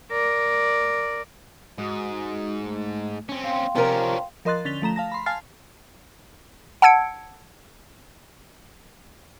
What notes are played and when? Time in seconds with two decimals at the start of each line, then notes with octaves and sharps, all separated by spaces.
0.12 A#4 D5
1.78 G#2 F#4 D#6
2.64 A3
3.29 C4 C#4
3.44 F5 G5 C6
3.75 C3 F3 C#4 D4 A#4
4.45 F3 A#4 D#5 C6 F#6 A6
4.65 D3 C#4 A6 B6 F7 G7
4.82 F3 A3 A#5 E7
4.96 F5 A5 A#6
5.12 B5 C6
5.26 F5 G#5 A5 F6 A6 C7
6.82 F#5 A5 E6 G#6 C#7 D7